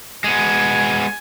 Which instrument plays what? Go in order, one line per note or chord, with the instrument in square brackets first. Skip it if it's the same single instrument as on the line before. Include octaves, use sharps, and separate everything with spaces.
[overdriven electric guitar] G#3 B3 [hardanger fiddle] G#5